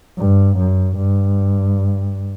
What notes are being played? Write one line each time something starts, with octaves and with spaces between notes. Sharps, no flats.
G2
F#2
G2